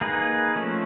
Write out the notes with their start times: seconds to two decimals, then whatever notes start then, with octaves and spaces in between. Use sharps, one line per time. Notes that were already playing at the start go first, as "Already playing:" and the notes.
0.01 A#3 D#4 G#4 B4
0.56 F3 A3 C#4